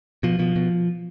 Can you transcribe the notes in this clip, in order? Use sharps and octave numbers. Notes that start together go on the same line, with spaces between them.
B2 F3
B2 F3
B2